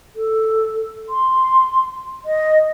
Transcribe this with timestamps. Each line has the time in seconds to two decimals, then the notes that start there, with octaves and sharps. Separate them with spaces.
0.16 A4
1.09 C6
2.25 D#5